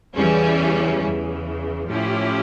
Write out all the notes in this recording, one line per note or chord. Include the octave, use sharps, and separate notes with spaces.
E2 C#3 E3 G3 C#4
E2 C#3 E3
A2 F3 C#4 E4 G4